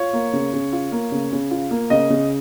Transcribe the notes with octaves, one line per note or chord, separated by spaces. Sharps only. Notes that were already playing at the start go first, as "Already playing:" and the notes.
Already playing: F4 C#5
A#3
C#3
C#3
F4
A#3
C#3
C#3
F4
A#3
C#3 D#5
C#3